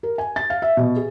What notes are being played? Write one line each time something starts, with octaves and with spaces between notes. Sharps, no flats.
A#4
G#5
A6
F5
E5
B2
G#4